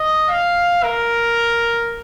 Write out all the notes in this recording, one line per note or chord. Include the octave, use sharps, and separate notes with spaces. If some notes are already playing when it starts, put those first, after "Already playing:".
Already playing: D#5
F5
A#4